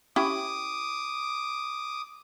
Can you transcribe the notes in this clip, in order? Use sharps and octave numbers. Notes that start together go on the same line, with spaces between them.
C#4 E4 G4 D6 D#6